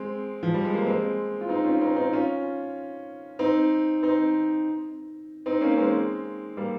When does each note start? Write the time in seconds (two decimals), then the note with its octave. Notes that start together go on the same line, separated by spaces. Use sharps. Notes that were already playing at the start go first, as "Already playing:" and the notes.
Already playing: G#3 C4
0.43 F3
0.54 G3
0.65 G#3
0.74 A#3
0.86 G#3 C4
1.41 F4
1.49 C4 D#4
1.64 C#4 F4
1.81 C4 D#4
1.96 C4 D#4
2.13 C#4 F4
3.39 C4 D#4
4.03 C4 D#4
5.46 C4 D#4
5.61 A#3 C#4
5.77 G#3 C4
6.57 G3 A#3